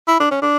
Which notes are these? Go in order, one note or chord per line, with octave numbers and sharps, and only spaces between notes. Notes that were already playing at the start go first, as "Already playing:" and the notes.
E4
D4
C#4
D4